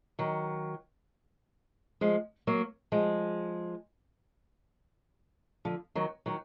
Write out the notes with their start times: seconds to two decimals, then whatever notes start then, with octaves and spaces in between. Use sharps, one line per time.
0.19 D#3 F#3
2.01 F3 G#3
2.47 F#3 A#3
2.92 F3 G#3
5.65 D3 F3
5.95 D#3 F#3
6.26 D#3 F#3